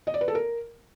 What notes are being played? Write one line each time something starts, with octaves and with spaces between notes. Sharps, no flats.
D#5
D5
B4
A4
A#4